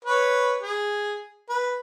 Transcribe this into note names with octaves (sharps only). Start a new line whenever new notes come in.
B4 C#5
G#4
B4